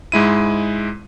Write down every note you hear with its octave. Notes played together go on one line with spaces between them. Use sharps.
G#2 G#3 E4 D#7